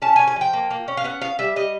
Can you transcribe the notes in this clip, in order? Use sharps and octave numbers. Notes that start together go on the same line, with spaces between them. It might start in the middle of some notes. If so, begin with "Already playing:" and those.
C#4 A5
G#5
C#4
G#5
F3 G5
A#3
A#3
C#4
F5
B3 F#5
B3 F5
G3 E5
G3 D#5